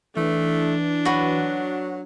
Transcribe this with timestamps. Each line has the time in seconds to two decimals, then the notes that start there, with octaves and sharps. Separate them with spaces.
0.17 E3 A3 D4
1.05 F#3 F#4 B4